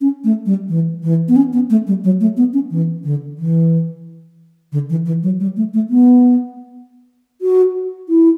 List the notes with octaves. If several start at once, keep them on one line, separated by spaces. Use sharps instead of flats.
C#4
A3
G3
E3
E3
B3
C#4
B3
A3
G3
F#3
A3
B3
C#4
E3
D3
E3
D3
E3
E3
F#3
G3
A3
A3
B3
F#4
E4